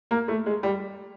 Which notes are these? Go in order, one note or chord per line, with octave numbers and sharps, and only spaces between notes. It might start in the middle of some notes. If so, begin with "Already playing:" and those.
A#3
A3
G#3
G3